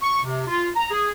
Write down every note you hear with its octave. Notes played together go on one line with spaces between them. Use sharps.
C#6
C3
F4
A#5
G#4